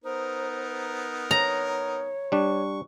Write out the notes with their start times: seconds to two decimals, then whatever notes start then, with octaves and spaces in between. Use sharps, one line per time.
0.04 B3 D#4 A#4 C5
1.31 C#5 A#5
2.32 G3 D4 C#6